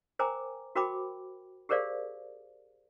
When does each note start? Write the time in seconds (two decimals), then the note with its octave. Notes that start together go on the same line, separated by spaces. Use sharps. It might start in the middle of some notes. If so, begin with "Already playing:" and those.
0.19 A#4 C5 G5 G#5 A#5 D6
0.76 F#4 A#4 C5 G5 B5 D6
1.69 G4 G#4 A#4 C5 D5 F5